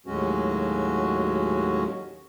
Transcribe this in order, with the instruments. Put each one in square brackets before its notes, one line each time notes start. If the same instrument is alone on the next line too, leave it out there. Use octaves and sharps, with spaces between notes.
[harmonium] D#2 A2 F#3 G#3 C#4 F#4